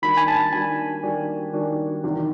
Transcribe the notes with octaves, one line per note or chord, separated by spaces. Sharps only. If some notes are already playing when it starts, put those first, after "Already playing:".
D#3 G3 A#3 D4 F#4 B5
G#5
A5
D#3 G3 A#3 D4 F#4 G#5
D#3 G3 A#3 D4 F#4
D#3 G3 A#3 D4 F#4
E2 C3 D#3